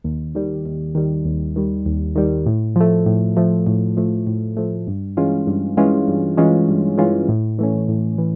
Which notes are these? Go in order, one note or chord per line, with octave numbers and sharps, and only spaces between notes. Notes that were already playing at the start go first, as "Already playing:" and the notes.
D#2
D#3 G3
D#2
D#3 G3
D#2
D#3 G3
D#2
D#3 G3
A2
F3 A3
A2
F3 A3
A2
F3 A3
A2
F3 A3
G2
E3 G#3 C#4 F4
G2
E3 G#3 C#4 F4
G2
E3 G#3 C#4 F4
G2
E3 G#3 C#4 F4
A2
E3 A3 C#4
A2
E3